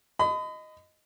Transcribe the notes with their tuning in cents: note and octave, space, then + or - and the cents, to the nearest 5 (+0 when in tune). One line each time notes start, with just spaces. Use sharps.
D#5 +0 B5 +40